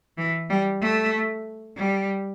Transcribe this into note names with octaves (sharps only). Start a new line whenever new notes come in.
E3
G3
A3
G3